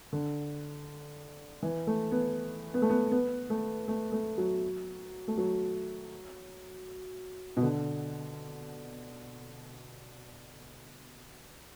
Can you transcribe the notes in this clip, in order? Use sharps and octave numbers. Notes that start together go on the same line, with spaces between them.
D3
E3
A3
B3
B3
A3
B3
B3
A3
A3
A3
F#3
A3
F#3
B2
D3